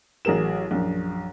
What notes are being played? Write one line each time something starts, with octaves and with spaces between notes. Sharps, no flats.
A1 F#3 G#4 A#4 E7
A#1 F#2